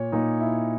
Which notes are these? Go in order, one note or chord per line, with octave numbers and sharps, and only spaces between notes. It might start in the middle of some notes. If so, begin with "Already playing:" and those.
Already playing: A#2 C#5
A#2 D#4
E4